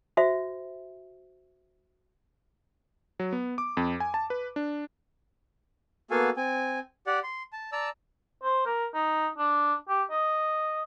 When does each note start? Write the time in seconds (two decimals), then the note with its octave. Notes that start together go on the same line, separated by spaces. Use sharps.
0.17 F#4 C5 E5
3.20 F#3
3.33 B3
3.58 D6
3.77 F2
4.00 G#5
4.14 A5
4.30 B4
4.56 D4
6.11 A#3 B3 F#4 A4 F5 G#5
6.37 C4 G#5
7.07 G4 D5 F#5
7.24 C6
7.53 A5
7.72 D5 A5 A#5 E6
8.44 C5
8.66 A#4
8.94 D#4
9.38 D4
9.89 G4
10.10 D#5